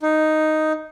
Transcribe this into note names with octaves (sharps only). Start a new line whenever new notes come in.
D#4